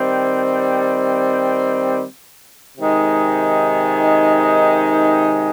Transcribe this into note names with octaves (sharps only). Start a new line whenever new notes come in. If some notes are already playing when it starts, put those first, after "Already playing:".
Already playing: D#3 G3 C4
C3 D#3 G#3 D#4